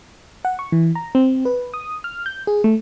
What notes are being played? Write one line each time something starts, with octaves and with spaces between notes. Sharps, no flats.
F#5
C#6
E3
A#5
C4
B4
D#6
F6
G6
G#4
A3